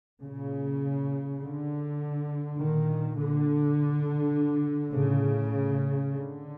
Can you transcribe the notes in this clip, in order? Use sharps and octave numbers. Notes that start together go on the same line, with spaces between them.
A#2 C#3
D3
A#2 D#3
D3
A2 C#3
D3